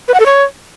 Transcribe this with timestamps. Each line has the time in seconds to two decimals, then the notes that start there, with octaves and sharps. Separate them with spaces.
0.08 B4
0.14 F#5
0.20 A4
0.26 C#5